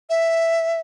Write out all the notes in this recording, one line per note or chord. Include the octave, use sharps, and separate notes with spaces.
E5